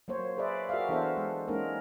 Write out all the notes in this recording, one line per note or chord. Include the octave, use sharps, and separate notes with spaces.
F#3 A#3 C5 C#5
G#4 B4 C5 D5 E5
F#4 G#4 A#4 D5 E5 F5
E3 B3 D4 A4 C5 E5
G#3
G#3 A#3 C#4 D#4 A#4